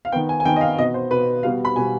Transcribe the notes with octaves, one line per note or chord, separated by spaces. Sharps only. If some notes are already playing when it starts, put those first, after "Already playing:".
F5
D#3 B3 G5
G#5
G#5
D#3 B3 G5
D#5
F5
B2 B3 D#5
C5
B2 B3 B4
B2 G3 B3 F5
B5
B2 G3 B3 G#5